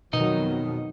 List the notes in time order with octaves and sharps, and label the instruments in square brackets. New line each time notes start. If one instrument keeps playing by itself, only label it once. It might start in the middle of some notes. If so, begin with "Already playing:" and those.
[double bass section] F2 D#3 F#3 [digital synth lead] B2 [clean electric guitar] D#4 D#5